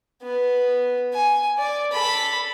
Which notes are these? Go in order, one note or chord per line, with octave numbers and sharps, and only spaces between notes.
B3
G#5
D5
A4 B5